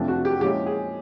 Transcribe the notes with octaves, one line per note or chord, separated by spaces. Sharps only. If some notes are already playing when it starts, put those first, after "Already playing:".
Already playing: F2 C3 F3 A3 D4
F#4
G4
A#2 F3 G#3 C#4 E4 G4
G#4